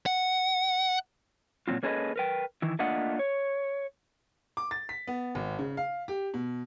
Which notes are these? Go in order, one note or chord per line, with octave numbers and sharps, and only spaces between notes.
F#5
A#2 D#3 F#3 C4 F4
A#3 C#4 G#4 A4 B4 D#5
A#4 B4 G5
D#3 E3 E4
A3 A#3 D4 F4 D#5 F#5
C#5
D6
A6
B6
B3
G#1
C#3
F5
G4
B2